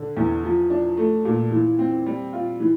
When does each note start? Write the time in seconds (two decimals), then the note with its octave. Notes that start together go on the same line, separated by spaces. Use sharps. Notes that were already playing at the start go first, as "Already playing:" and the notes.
Already playing: D3
0.17 E2
0.44 F3
0.70 D4
0.97 A3
1.25 A#2
1.51 E3
1.79 C4
2.06 G3
2.33 F4
2.60 E3